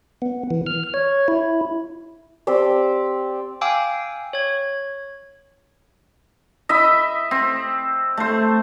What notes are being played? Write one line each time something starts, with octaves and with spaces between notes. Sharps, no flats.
B3
E3
F6
C#5
E4
C4 G4 C5 D5
F5 G5 G#5 D6 E6
C#5 G#6
D#5 E5 B5
C4
A3 C5